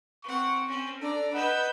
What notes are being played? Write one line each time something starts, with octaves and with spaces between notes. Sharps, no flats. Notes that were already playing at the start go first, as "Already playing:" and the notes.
C4 F#5 C#6
C4 C#4
D4 A4 D5 A#5
B4 D#5 F#5 B5 E6 G6